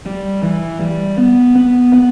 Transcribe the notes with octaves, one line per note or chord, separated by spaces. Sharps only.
G3
E3
G3
B3
B3
B3